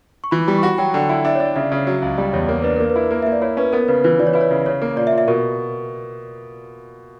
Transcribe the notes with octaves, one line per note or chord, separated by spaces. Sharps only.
C#6
E3 B5
G3
C#6
F#4 B5
F#3 G5
D3 G5
E4
D4 E5
C#5
D4
D5
C#3 E5
C#3
F#3
C#2
G3 D5
E2 C#5
A#3 C#5
D4 B4
A#3 A#4
B4
E4
A#3
A#3 E5
D5
E4 C#5
C#4 B4
B3 A#4
C#3 B4
E3 B4
E3 D5
C#5
E4 B4
C#5
C#3
C#3 C#5
A#3
A#2 D5
E5
A#2
E5
B2 A#4